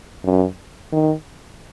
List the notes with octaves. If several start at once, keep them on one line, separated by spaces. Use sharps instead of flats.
F#2
D#3